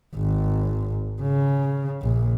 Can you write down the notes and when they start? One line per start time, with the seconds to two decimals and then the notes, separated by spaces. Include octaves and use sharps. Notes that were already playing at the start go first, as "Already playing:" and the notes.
0.16 G#1
1.22 C#3
2.02 A#1